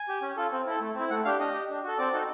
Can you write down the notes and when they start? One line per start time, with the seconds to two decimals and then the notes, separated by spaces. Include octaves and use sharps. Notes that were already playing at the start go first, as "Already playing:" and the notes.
Already playing: G#5
0.08 G4
0.22 C#4
0.37 F4 A4
0.52 C4
0.66 E4 A4
0.81 A3
0.95 C4 E4
1.10 A3 F#5
1.25 D4 G4 F5
1.40 D4 D#5
1.54 G4
1.69 D4
1.83 F#4 A4
1.98 C4 D5
2.13 D#4 F#4 A4